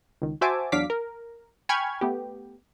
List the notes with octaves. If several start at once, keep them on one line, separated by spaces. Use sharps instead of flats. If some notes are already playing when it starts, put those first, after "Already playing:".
C#2 D#3
F#4 C5 E5 G#5 A5 D6
E2 F#3 D4 F5 D6 B6
A#4
G5 G#5 B5 C#6 F6 G#6
A3 B3 G4